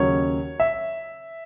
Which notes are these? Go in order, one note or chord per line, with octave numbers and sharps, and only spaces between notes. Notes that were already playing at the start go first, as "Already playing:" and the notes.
Already playing: D#2 C#3 F#3 C#4 C#5
E5